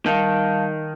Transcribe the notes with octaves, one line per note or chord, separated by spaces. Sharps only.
D#3 G3 F5 A5